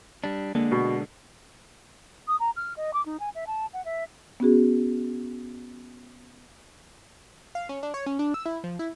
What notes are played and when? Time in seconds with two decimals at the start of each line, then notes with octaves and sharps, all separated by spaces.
0.24 G3 D4
0.55 D3 G#3 A#3 D4
0.72 B2
2.28 D#6
2.40 A#5
2.56 F6
2.77 D#5
2.94 D6
3.06 D#4
3.20 G#5
3.35 E5
3.47 A5
3.73 F#5
3.85 E5
4.40 B3 C#4 F#4 G#4
7.55 F5
7.69 C#4
7.83 D4
7.94 C#5
8.06 C#4
8.19 D4
8.34 E6
8.46 E4
8.64 F3
8.79 E4